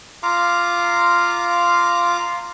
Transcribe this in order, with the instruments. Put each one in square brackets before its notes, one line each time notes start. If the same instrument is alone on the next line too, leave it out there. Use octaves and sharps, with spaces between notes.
[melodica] F4 F5 A#5 D6